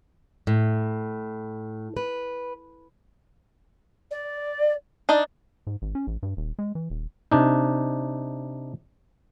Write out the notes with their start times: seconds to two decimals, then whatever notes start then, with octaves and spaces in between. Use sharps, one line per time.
0.47 A2
1.97 B4
4.11 D5
5.09 D4 D#4 D5 D#5
5.67 G#2
5.82 G#1
5.95 C#4
6.07 A1
6.23 G2
6.37 D#1
6.59 G#3
6.75 E3
6.90 D#1
7.31 C3 D4 D#4